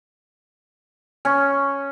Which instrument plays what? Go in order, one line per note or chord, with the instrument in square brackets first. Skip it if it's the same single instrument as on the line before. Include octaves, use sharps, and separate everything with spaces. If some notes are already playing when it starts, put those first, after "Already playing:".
[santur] C#4